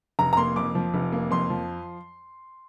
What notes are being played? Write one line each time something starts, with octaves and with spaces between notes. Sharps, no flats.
F1 A#5
A#5
A#3 C6
F2 D6
F3
F1
A#3
F2 C6
F3